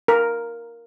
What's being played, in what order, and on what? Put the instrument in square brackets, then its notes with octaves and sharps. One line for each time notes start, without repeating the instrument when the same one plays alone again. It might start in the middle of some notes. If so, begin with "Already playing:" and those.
[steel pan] A#4